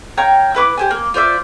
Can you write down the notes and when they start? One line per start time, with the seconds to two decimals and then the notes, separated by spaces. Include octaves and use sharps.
0.17 C#5 F5 G5 A#5
0.55 E4 B4 C#6 D6
0.77 G4 C5 G#5
0.91 A#3
1.14 F4 C5 D5 E5